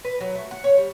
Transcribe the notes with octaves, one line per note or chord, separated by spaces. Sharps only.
B4
F#3
A3
F#5
C#5
G3